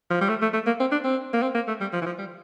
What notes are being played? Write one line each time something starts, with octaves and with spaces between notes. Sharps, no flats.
F3
G3
A3
A3
A3
A#3
C4
D4
C4
A#3
C4
A#3
A3
G3
F3
E3
F3
G3